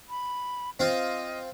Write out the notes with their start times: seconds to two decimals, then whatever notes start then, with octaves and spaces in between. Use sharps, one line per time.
0.09 B5
0.80 C4 F4 D#5